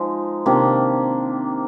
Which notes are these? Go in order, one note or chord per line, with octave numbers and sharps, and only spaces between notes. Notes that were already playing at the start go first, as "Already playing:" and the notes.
Already playing: F3 G#3 D#4
C3 D#3 A#3 D4